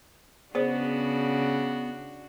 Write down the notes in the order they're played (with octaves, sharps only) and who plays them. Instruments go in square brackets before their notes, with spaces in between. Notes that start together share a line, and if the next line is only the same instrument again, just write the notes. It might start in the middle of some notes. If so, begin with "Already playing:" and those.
[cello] C#3 [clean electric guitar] B3 [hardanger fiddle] D4 F#4 [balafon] G#4 C5 D5